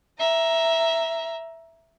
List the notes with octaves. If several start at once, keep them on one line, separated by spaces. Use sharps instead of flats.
E5 A#5